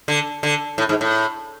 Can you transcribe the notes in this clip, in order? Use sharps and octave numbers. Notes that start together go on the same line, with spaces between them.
D3
D3
A2
G#2
A2